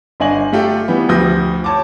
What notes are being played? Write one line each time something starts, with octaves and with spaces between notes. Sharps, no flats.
G1 D4 D#5 G#5 F#7
A3 F4 G4 A4
E3 G3 B3
D2 F3 G4 D#6 G6 A#6
C#5 A5 D6